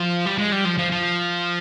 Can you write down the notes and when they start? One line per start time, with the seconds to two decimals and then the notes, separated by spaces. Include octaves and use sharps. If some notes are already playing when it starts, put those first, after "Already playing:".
Already playing: F3
0.26 G3
0.38 G#3
0.52 G3
0.65 F3
0.78 F3
0.92 F3